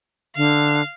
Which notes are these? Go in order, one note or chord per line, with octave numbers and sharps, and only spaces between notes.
D3 F5